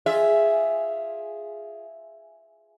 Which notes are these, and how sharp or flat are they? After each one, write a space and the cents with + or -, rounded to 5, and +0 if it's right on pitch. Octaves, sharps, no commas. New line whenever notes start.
F4 +0 G#4 +0 E5 +0